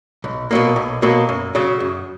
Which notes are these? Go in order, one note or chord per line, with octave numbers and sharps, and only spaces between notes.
B1
B2 F#3 A#3
B1
B2 F#3 A#3
F#2
C#3 F#3
F#2